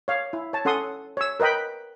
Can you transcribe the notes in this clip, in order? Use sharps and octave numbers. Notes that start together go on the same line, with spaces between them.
C#5 F5
E4
C#5 A5
C#4 A4 F#5 C6 D#6
C#5 E6
A#4 B4 D#5 G5 B5